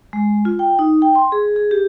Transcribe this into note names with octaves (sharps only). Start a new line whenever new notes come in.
G#3
F4
G5
D#4
G5
C6
G#4
G#4
G4